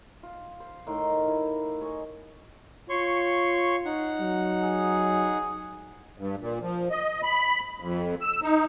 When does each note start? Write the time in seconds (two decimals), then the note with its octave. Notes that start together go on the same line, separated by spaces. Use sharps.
0.23 F4
0.60 C5
0.87 A2 D#3 A#4 C6
1.28 E4
1.81 C#5 D#5 G#5
2.89 F4 C#5 C6 C#6
3.85 D#4 F#5
4.21 F#3
4.64 G#4
6.18 G2
6.40 A#2
6.61 F3
6.91 D#5
7.23 B5
7.80 F2
8.21 E6
8.42 D#4